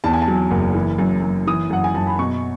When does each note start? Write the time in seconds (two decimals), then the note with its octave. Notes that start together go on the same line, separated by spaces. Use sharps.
0.04 E2 A5
0.13 G#5
0.22 A5
0.28 F#3
0.51 F#1
0.75 E3
0.99 F#2
1.22 F#2
1.47 E3 D#6
1.70 F#2 F#5
1.84 G#5
1.94 F#2 A5
2.07 B5
2.19 B2 C#6